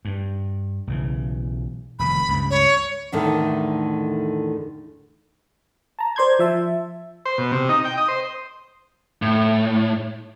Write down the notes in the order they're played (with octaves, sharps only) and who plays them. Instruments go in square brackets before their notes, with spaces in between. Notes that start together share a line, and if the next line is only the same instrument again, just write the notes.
[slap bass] G2
B1 C#3 E3
[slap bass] F1 D#3 [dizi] B5
[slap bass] C#2 G2
[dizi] C#5
[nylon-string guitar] E2 A2 D3 D#3 A3
[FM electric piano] A5 A#5
C5 D5 C6 G6 G#6
F3 E5 A5
[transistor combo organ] C5
B2
C3
D#4
G5
D#5
C5
[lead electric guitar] A2